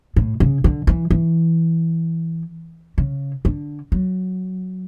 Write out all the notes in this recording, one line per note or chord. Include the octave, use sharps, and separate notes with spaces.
A2
C#3
D3
E3
E3
C#3
D3
F#3